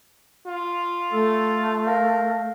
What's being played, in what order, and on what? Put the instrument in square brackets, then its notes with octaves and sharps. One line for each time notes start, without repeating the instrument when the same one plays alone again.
[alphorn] F4
[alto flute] A3 [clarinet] A4
[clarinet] A#4 [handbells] F5